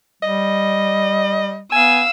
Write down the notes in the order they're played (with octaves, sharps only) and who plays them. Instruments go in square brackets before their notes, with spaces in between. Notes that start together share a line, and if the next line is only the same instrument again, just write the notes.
[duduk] G3 [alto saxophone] D#5
[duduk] B3 [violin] F5 E6 [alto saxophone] G#5